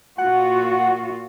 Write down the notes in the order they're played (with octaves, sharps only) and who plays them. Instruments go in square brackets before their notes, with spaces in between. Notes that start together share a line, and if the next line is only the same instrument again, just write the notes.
[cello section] A#2 F4 F#4 [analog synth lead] F#5